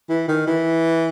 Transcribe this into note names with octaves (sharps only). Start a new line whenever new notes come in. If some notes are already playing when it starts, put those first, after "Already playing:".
E3
D#3
E3